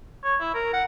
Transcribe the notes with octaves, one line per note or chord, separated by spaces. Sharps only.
C#5
E4
A#4
F#5